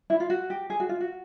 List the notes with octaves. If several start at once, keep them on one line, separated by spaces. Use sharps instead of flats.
E4
F4
F#4
G4
G#4
F#4
F4
F#4